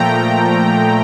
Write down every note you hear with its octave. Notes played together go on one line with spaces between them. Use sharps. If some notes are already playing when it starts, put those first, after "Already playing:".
Already playing: A#2 F3 A3 G5 A#5